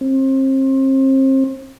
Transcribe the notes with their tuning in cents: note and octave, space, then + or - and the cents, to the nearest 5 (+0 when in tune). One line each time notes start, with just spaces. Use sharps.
C4 +35